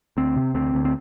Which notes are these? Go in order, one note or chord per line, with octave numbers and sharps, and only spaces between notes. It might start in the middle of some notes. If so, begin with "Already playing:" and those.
D2 C4
C3
D2 C4
D2
C4